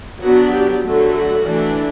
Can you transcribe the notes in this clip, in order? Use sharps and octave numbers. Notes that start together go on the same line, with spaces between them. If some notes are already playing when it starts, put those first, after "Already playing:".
F#3 B3 D4 F#4
G4
D3 F#3 A3
F#4
E3 A3 D4